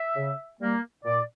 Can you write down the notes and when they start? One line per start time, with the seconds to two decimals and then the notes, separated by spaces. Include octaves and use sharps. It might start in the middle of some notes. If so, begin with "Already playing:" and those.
Already playing: E5
0.16 C#3
0.61 G3 A#3
1.05 A#2 D5